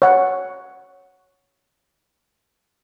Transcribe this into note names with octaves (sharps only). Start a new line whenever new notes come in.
C#5 F#5